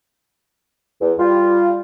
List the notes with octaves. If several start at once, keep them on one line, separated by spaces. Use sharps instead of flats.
E2
G3 F4